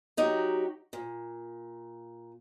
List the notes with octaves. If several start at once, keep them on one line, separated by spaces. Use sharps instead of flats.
F#3 D#4 F#4 G4
A#2